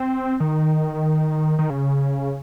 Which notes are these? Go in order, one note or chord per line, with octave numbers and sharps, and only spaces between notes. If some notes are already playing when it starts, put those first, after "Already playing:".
Already playing: C4
D#3
D#3
C#3